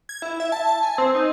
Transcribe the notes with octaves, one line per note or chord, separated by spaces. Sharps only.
G#6
E4
E5
A5
A5
G#5
C4
D#4